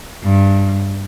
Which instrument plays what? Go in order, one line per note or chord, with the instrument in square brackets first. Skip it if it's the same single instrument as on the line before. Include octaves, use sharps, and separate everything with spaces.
[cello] G2